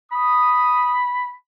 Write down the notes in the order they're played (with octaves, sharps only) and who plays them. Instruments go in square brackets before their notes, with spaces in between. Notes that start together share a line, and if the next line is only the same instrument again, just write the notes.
[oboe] B5 [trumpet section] D#6